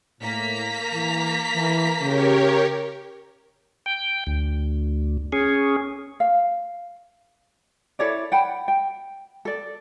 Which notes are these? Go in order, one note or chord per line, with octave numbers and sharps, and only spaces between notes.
A2 A#3 A#5 B6
E3
E3
C#3 G4 A#4 C#5
G5
D2
C#4 G#4
F5
E4 A4 C#5 D5
F#5 G5 B5
G5
A4 D5